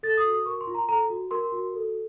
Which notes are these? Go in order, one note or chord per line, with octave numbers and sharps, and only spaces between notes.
A4 A6
D#6
F#4
D#6
A#4 C#6
C6
F4
A#5
A4 A#5
F#4
A#4 C6
F#4
A4